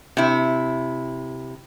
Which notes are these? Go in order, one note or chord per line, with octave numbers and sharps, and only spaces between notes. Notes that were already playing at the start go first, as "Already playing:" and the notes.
C3 E4